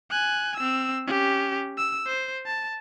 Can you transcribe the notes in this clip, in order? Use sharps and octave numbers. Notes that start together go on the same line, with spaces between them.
G#5 F#6
C4 E6
C#4 G4
E6
C5
A5